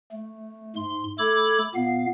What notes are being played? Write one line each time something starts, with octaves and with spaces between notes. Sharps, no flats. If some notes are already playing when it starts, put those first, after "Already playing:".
A3
G#2 C6
A3 A4 B5 D6 G#6
A#2 B3 F5